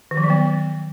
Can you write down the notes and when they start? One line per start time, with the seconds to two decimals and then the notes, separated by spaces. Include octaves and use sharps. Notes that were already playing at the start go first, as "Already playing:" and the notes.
0.11 D#3
0.17 F3
0.24 F#3
0.30 B3